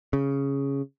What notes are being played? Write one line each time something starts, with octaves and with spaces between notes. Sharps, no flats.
C#3